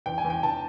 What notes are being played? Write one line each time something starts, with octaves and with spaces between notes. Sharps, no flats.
E2 G5
G#5
E2
G5
E2 A5